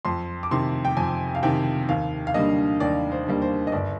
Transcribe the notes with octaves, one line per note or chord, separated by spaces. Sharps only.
F2 C6
D6
C3 D#3 C6
G5
F2 G#5
F5
C3 D#3 G5
D#2 F5
F5
D3 G3 A#3 D#5
D#2 D5
C5
D3 G3 A#3
C5
D#5
G1 D5